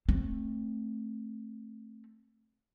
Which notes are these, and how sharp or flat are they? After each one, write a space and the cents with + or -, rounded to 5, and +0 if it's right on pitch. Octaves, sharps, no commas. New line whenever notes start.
A3 +0 C4 +20